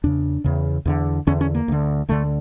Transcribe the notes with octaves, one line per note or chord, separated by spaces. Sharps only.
E2 C#3 D4
E2 C#3
E2 D3
E2 D3 C#4
C#4
A#3
D2 D3
D2 D3 A3